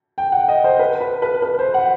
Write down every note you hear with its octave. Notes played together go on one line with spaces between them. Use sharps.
G5
F#5
D#5
C5
B4
B4
B4
B4
C5
F#5